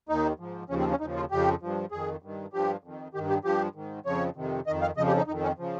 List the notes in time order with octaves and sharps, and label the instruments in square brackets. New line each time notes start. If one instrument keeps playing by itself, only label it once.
[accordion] D#2 D#3 D#4
G#2 F3
D#2 C#3 F3 C#4
C4
C#4
D#2 C#3 F3 D#4
F4
F2 C#3 F3 G4
G2 F3
F2 D#3 G#4
G2 D#3
G2 F3 G4
F2 D#3
G2 D#3 G4
G4
G2 F3 G4
G#2 D#3
F2 C#3 F3 C#5
F2 C3 D#3
D#3 D#5
F2
F5
F2 C#3 F3 D#5
G4
D#4
F2 D#4
D#3
C#4
C#3 F3